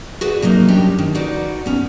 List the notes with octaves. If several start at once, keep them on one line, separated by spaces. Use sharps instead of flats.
F#4 G#4 B4 D5 E5
C3 F#3 A#3 D#4
F#2 G3 D4 G4 C#5 G5
D#3
D#4 F#4 B4 D5 F#5
B3 C#4